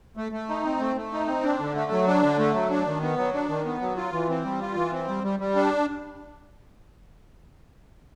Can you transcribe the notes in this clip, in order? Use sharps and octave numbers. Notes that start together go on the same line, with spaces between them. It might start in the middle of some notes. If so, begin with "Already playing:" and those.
A3
A3
D#4
C4
A3
A3
D#4
C4
D4
D3
A3
F#3
D4
D3
A3
F#3
D4
D#3
B3
F#3
D4
D#3
B3
F#3
F4
E3
C4
G3
F4
E3
C4
G3
G3
G3
D4